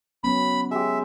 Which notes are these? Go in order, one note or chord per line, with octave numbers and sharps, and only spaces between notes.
F#3 B3 C#4 B5
G#3 G4 E5